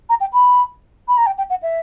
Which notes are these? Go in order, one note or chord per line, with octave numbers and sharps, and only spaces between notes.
A#5
G5
B5
B5
A#5
G5
G5
F#5
E5